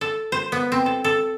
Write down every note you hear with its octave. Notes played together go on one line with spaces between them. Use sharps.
A4
C5
B3
C4
A4
A4